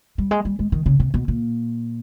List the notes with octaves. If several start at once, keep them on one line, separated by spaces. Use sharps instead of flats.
G3
G#3
G3
G#3
D#3
C#3
C3
B2
A#2